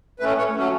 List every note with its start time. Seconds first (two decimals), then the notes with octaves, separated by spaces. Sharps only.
0.19 A2 A3 C#4 B4
0.38 C#5
0.56 F#3 A3 C#4